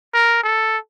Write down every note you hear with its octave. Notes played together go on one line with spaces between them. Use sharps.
A#4
A4